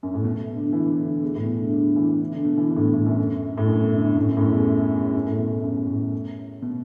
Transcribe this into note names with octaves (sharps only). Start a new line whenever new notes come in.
F#2
A2
B2
B2
D3
E3
D3
E2
A2
B2
D3
D3
E3
D3
D3
B2
E3
D3
A2
B2
A2
F#2
A2
F#2
B2
D3
F#2
A2
F#2
A2
F#2
E2
F#2
A2
B2
A2
F#2
A2
B2